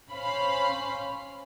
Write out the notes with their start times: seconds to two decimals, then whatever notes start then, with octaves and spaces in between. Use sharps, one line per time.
0.13 C#4 C5 F5 B5